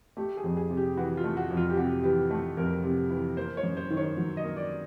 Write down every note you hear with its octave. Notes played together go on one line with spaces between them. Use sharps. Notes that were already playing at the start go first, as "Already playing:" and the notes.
A3 G4
G#4
F2
G#4
C3
G4
E3 F#4
F4
A3
F#4
F2
F4
G4
C3 F#4
E3 G4
A3
F2 A#4
C3
E3
A#3 C5
C#5
F#2
C5
D#3
C#5
F#3
D#5
A#3
D5